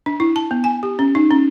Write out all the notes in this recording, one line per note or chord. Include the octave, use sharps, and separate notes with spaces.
D4
E4
A5
B3
G#5
G4
C#4
D#4
C#4